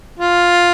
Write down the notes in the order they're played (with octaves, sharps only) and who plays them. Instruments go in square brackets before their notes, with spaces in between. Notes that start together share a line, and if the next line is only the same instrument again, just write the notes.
[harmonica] F4